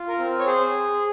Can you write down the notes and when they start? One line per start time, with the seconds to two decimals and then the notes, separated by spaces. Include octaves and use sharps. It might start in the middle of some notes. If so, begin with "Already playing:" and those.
Already playing: F4
0.08 A#4
0.18 C4
0.39 C#5
0.46 G#4 C5